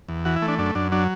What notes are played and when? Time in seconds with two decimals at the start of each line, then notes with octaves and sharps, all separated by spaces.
0.09 E2
0.25 E3 F#4
0.36 E4
0.42 A3
0.48 D4
0.58 F#2 D4
0.75 F#2 D4
0.92 F#3 D4